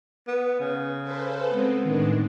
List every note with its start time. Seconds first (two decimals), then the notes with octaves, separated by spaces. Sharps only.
0.28 B3
0.60 C#3
1.02 A4 B4 C5
1.50 G#3 B3 C4
1.85 A2 D#3 G#3 D4